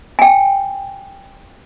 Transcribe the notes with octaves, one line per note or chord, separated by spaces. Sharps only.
G5 G#5